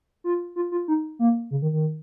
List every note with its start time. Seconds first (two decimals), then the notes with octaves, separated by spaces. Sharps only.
0.24 F4
0.56 F4
0.72 F4
0.88 D#4
1.19 A#3
1.51 C#3
1.62 D#3
1.73 D#3